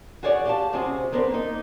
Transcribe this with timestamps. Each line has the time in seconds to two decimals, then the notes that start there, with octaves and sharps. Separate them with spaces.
0.23 F#4 G#4 C#5 D5 F5 F#5
0.45 G4 F5 A5
0.73 C3 C4 C#4 F#4 G#4
1.12 B3 C4 D4 A#4 C5
1.31 A#3 D#4